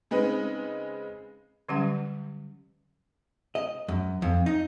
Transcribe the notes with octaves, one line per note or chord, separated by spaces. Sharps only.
C#3 G#3 C4 D#4 B4
D3 F#3 G3 C#4 G4 F#5
D#5
F#2
F2
D#4